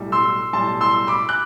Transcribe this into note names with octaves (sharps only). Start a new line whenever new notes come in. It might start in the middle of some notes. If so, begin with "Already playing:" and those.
Already playing: B1 A2 G3
C6 E6
B1 A2 G3 A5 C6
C6 E6
B5 D6
F#6